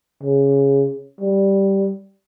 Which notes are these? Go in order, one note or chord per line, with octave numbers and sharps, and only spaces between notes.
C#3
G3